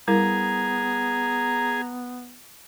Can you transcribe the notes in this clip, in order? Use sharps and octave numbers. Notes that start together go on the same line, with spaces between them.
G3 B3 E4 G#4 A#4 A#5